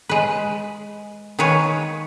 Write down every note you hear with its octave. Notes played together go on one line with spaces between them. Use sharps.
G#3 B4
D#3 G#3 A#3 B4 C#5